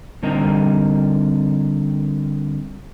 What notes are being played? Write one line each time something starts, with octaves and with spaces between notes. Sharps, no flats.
D3 G3 C4 A#4 D#5 A#5